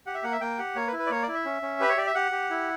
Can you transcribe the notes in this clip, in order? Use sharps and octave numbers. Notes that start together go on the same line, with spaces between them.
G4 F#5
E5
A#3 F#5
E5
A#3 G5
G4 F#5
A#3 C#5
B4
E4
B4
D5
A#3 C#5
D5
E4
E5
C#4
C#4
G4 B4
C#5
G4 D5
E5
G4 F#5
G4
E4